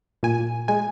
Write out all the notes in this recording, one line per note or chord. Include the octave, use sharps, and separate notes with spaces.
A#2 G#5
G#3 G#5